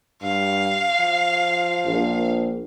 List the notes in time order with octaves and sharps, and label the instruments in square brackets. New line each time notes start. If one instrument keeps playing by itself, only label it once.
[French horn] G2 [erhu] F5
[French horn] F3
[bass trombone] A#1